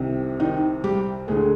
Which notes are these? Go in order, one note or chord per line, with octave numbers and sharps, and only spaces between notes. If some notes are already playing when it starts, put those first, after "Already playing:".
Already playing: C2 C3 D#3
D#3 D#4
G3 G4
D2 D3 G#3 G#4